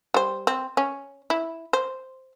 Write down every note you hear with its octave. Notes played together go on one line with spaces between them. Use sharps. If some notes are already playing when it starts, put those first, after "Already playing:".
G3 C5
C4
C#4
E4
C5